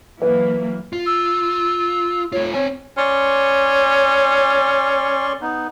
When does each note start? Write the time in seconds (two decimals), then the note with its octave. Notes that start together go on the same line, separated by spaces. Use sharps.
0.22 E3 F#3 A#3 B4
0.93 F4
1.06 E6
2.32 A3 F4 C#5
2.54 C4 C#5 G#5
2.97 C#4 D5 C6 C#6
5.41 B3 D#4